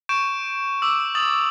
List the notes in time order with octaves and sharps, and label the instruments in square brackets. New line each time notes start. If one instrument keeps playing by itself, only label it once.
[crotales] C#6 G6 D7 E7
D6 E6
D#6 A6 F#7